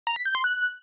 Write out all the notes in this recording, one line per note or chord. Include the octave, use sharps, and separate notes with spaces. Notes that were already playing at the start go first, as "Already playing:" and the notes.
A#5
B6
G6
C6
F#6